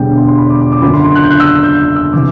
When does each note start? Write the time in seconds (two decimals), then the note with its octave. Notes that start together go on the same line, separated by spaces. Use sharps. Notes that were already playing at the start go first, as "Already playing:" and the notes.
Already playing: E1 E2 D3 G3 G5
0.17 C6
0.28 C6
0.38 B5
0.49 D6
0.61 D6
0.72 D6
0.82 F#1 F#2 D3 B5
0.94 C6
1.04 C6
1.15 F#6
1.23 G6
1.30 F#6
1.40 E6
1.47 F#6
1.63 G6
1.96 E6
2.13 C3 E3 D6